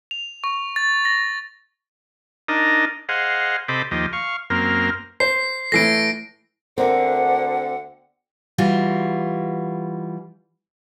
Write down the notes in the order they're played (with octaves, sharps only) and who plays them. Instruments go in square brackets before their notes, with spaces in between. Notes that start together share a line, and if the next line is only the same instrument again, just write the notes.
[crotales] F7
C#6
A6
A#6
[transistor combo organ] D4 D#4 A#4 D#5
G#4 C5 D#5 F5 F#5
C3 A4 C5 D#5 B5 D6
D#2 F3 G4 D#5
F5 C#6
F#2 A#3 C4 A#4 F6
[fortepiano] C5 [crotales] C7
[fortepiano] A2 E3 A3 [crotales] A#6 C7 D7
[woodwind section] D2 D3 [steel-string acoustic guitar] C4 [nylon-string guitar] A#4 [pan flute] F#5
[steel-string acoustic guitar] E3 G3 F4 F#4